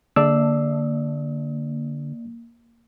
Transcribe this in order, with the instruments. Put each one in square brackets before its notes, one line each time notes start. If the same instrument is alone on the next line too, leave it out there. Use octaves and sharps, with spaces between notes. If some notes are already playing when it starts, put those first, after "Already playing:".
[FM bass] D3 [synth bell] A#3 [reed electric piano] D5 E6